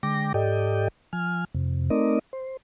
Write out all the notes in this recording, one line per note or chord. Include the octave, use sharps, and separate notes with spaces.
D3 G#3 G5 D6 A#6
G#2 G4 A4 D5 D#5 G5
F3 G#5 F6
F2 C3
A3 C4 D#4 A#4 D5 D#5
C5